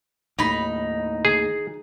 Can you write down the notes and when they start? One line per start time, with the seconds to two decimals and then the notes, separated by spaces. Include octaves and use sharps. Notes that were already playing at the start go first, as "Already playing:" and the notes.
0.39 D#2 A2 D#4 B5
1.25 G#4